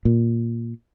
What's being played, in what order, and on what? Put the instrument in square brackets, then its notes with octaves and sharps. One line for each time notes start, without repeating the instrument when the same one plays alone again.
[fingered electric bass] A#2